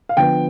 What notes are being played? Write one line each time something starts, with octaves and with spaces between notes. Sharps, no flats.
F5
D3 F3 B3 G5